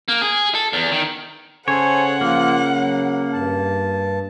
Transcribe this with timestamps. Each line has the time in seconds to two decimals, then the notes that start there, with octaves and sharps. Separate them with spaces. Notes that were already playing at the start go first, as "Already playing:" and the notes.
0.08 A#3
0.22 G#4
0.55 A4
0.73 E2
0.92 D#3
1.68 C#3 A4 C5 C#5 F#5 G#5
2.21 F3 A#3 F4
2.75 F#3
3.33 G2 A5